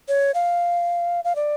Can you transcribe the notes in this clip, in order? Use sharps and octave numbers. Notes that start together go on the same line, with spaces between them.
C#5
F5
F5
D5